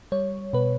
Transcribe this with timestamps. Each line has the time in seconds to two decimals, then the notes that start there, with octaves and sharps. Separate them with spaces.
0.12 G3 C#5
0.53 B2 B4